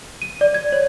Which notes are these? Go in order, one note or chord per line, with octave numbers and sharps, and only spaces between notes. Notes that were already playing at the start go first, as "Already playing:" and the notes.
D#7
D5
G#6
C#5